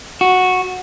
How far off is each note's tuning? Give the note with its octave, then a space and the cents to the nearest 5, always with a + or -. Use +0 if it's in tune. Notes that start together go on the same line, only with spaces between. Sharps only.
F#4 -10